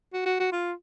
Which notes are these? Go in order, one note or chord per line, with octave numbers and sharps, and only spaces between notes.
F#4
F#4
F#4
F4